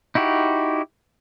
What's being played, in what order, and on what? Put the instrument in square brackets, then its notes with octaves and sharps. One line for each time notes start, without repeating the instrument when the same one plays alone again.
[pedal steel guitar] D#4 E4 F#4 G4